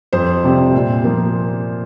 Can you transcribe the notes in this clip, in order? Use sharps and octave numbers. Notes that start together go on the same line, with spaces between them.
F2 C5
C3 G3 C4
A#2
F3 A#3